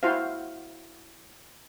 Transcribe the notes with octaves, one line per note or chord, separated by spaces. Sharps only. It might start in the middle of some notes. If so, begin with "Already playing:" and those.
E4 F#4 C5 F5